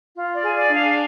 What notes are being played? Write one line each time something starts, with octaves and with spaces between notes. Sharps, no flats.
F4
D5
G#4
D5
D4
F5